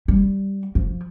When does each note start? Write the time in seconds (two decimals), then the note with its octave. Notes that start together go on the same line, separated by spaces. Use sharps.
0.08 G3
0.75 F3